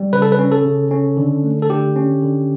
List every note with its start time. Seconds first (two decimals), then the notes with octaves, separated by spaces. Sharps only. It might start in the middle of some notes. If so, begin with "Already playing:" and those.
Already playing: G3
0.13 C#3 B4
0.22 A4
0.32 B4
0.39 C#4
0.52 A4
0.65 C#3
0.91 C#4
1.17 D3
1.44 A3
1.62 A4
1.69 D3 G4
1.96 C#4
2.22 D3